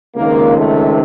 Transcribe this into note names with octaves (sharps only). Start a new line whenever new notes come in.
C#2 C3 D#3 A#3
A3